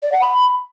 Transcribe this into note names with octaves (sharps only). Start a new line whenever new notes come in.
D5
F#5
B5